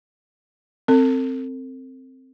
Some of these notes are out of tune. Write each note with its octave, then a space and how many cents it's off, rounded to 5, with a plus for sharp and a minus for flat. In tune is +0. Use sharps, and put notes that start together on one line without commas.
C4 +0 A4 +45